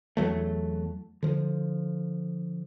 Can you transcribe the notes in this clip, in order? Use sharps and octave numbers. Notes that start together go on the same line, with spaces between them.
E2 F#3 A3
D3 F3